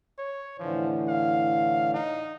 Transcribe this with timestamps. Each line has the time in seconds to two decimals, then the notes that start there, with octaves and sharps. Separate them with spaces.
0.18 C#5
0.59 A2 D3 E3 F3
1.09 F5
1.94 D#4